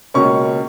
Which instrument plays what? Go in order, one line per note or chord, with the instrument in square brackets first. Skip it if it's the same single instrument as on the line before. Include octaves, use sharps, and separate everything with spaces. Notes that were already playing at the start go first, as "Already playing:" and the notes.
[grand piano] C#2 B2 A#3 C#4 C#6